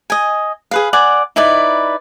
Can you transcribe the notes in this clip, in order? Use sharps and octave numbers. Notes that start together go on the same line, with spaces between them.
D#5 G#5
G#4 B4 F5
D5 F#5 G#5
D#4 E4 B4 D5